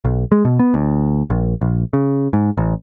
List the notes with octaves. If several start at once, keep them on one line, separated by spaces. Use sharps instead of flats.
B1
G#3
B2
B3
D2
A#1
A#1
C#3
G#2
A1